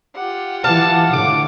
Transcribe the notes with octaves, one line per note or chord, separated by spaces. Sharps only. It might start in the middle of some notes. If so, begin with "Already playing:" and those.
F4 G4 F#5
E3 F5 A5
A2 D3 D6